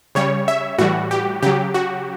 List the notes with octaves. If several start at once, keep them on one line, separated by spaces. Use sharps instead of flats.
C#3 G3 C#5
E5
A2 E3 G3 F#4
G4
C#3 F#3 G4
F#4